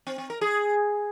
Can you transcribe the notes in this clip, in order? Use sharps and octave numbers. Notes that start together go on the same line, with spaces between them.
C4
C4
A#4
G#4